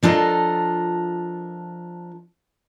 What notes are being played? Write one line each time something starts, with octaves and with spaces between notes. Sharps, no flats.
F3 D4 F4 A4 A#4 D#5